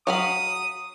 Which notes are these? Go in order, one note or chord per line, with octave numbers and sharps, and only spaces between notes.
F#3 F5 B5 D#6